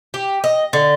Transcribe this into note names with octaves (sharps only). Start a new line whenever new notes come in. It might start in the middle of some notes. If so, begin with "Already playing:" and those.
G4
D#5
D3